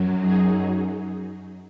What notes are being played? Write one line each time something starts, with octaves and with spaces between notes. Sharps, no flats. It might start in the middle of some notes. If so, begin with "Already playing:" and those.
Already playing: F#2 F#3
D#4 G#4